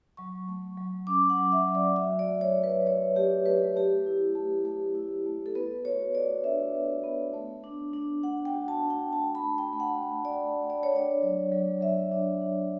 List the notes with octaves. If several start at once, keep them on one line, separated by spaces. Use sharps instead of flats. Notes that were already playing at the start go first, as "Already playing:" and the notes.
F#3 C#6
A3
F#3
C#4 D6
F#5
F#3
E5
F#3
D5
F#4 E5
D5
A3
C#5
A3
B4
A3 C#5
A3 G4
A3 B4
A3 G4
E4
A3
A3
E4
A3
A4
B3 B4
F#4 C#5
F#4 D5
D4 E5
B3
B3
A3
D4
D4
D4 F#5
G5
F#4
A5
D4
G5
D4 A5
B5
A3
G5
A3
F#5
A3
D5
A3
A3
D5
C#5
D4 D5
F#3
F#3
F#3 E5
D4
D4